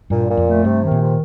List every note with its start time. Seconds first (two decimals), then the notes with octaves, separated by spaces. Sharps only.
0.10 G2 A#2
0.29 A#2
0.37 F2
0.46 A3
0.64 G2 C3
0.82 D#3
0.91 A#2
1.01 C3